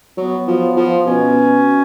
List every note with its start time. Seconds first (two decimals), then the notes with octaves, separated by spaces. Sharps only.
0.18 F#3 B3
0.47 F3
0.77 F3
1.05 B2 C#4